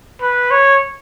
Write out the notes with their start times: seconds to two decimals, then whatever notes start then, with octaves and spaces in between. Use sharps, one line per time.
0.21 B4
0.51 C#5